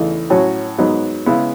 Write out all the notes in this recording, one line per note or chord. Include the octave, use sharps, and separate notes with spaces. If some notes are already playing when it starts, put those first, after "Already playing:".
Already playing: E2 C#3 E3 A3 D#4
A2 F#3 C#4 F#4
G#2 F#3 B3 D#4
C#3 G#3 B3 E4